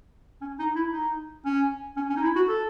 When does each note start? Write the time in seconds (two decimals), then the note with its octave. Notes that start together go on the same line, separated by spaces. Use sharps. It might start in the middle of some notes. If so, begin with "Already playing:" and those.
0.41 C#4
0.59 D#4
0.76 E4
0.93 D#4
1.45 C#4
1.97 C#4
2.10 C#4
2.17 D#4
2.23 E4
2.36 F#4
2.48 A4